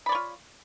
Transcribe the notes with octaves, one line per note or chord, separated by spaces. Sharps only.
F4 C#5 D5 B5